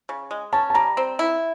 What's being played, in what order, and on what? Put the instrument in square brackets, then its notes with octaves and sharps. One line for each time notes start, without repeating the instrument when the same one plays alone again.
[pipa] C#3
G#3
[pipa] C#4 [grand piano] A5
[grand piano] A5
[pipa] G3 [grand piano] A#5
[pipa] C4
E4